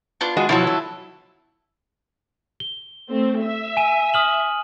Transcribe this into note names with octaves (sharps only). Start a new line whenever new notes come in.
B3 D4 F4
G#3 F#4 D#5
B2 F3 F#3 E4 A4
F#3
G7
A3 C4
E5
G#5 D#7 E7
D#6 F6 F#7